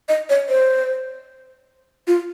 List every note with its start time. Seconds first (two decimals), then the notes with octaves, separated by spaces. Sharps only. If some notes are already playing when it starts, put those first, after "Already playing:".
0.09 D#5
0.30 C#5
0.49 C5
2.07 F4